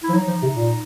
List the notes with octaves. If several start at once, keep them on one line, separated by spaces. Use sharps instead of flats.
E4
F3
F#3 D#4
F3
C3
A#2